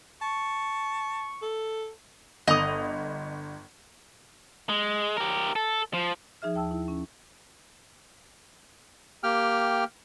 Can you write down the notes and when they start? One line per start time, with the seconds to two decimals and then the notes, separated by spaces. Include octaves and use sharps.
0.22 A5 C#6
1.42 A4
2.47 G1 D#5 D#6 F7
4.69 G#3
5.17 G4 A#4
5.56 A4
5.94 F3
6.42 F3 D#4 G#4 E5 F6
6.55 D#2 G5 A5 E6
6.71 E4
6.88 C#4
9.23 A#3 G4 G5 F6